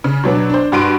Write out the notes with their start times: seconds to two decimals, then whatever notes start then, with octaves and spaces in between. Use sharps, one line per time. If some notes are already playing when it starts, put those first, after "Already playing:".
0.04 C#3
0.24 B2 F#3 B3 D4
0.50 D4 C5
0.72 G2 F#4 C6 D7 D#7